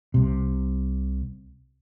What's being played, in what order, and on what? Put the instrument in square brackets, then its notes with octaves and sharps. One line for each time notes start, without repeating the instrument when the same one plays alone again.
[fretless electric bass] C2 C3